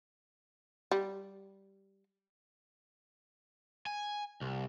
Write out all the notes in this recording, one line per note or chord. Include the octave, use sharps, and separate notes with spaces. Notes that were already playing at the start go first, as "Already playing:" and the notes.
G3
G#5
C2